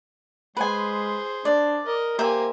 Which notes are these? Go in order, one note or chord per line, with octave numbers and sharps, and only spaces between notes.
G#3 G#4 B4 C5 G#5
D4 D5
A#4 D#5
A#3 G4 C5 E5 G#5